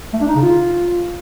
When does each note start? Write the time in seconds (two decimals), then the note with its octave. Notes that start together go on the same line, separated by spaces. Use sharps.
0.13 A3
0.21 D4
0.28 D#4
0.35 C#3
0.42 F4